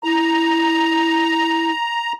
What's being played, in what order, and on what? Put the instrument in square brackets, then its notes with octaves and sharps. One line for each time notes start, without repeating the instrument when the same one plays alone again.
[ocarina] E4 [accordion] A#5